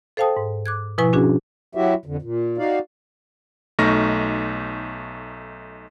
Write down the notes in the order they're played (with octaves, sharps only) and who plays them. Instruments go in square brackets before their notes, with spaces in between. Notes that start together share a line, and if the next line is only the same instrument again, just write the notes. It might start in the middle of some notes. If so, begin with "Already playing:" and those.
[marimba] A4 C5 F5 G5 A5 D#6
G#2
D6 F#6 G#6
B2 F3 E4 B4 G#5 C#6
C#4 D4 F#4 G#4
[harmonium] F#3 E4 F#4 G4 E5
F2 D3
A#2
D#4 F#4 D5 F5
[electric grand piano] B1 A3 D#4 C#6 F6 A#6